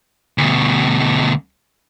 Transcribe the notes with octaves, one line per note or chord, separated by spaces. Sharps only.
D2 B2